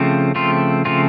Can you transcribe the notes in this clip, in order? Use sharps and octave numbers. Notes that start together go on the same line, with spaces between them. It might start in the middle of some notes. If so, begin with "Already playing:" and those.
Already playing: C#3 F3 A3 C4
C#3 F3 A3 C4 F4
C#3 F3 A3 C4 F4